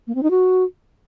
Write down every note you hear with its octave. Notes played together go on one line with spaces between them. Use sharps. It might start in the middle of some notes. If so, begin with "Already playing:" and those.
A#3
C4
D#4
F#4